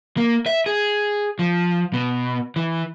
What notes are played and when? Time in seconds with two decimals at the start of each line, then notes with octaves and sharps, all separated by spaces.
0.17 A#3
0.46 E5
0.66 G#4
1.39 F3
1.94 B2
2.56 E3